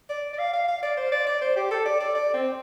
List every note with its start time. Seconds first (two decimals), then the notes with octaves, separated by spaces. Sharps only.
0.09 D5
0.33 D5
0.39 F5
0.53 F5
0.68 F5
0.83 D5
0.97 C5
1.12 D5
1.27 D5
1.41 C5
1.56 G4
1.71 A4
1.86 D5
2.00 D5
2.15 D5
2.34 C4